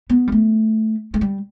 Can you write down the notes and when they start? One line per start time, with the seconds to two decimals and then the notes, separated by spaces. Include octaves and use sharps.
0.10 B3
0.27 G3
0.32 A3
1.14 A3
1.21 G3